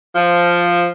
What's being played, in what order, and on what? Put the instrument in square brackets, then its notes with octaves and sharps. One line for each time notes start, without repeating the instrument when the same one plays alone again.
[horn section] F3